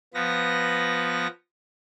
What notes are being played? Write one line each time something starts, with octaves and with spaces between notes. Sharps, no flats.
F3 B3 B4 A#6